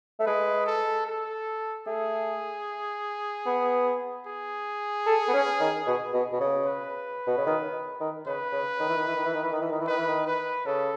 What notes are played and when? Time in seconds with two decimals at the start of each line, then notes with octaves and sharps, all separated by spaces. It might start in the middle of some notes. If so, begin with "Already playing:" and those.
0.20 A3
0.26 G#3 B4
0.67 A4
1.07 A4
1.87 A3 G#4
3.46 B3
4.27 G#4
5.07 A4
5.28 B3
5.33 C#4
5.60 D#3
5.87 B2
6.14 B2
6.32 B2
6.40 C#3
6.66 B4
7.27 B2
7.37 C#3
7.46 D#3
8.01 D#3
8.27 C#3 B4
8.53 C#3
8.80 D#3
8.89 E3
8.98 D#3
9.08 E3
9.16 D#3
9.25 E3
9.35 D#3
9.44 E3
9.52 D#3
9.62 E3
9.71 D#3
9.81 E3
9.87 D#3 B4
9.98 E3
10.07 D#3
10.27 B4
10.66 C#3 A4